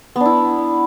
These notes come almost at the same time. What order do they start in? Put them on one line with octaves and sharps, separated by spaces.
B3 D4 E4